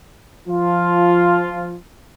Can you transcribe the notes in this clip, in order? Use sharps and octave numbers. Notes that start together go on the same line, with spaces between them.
F3 F4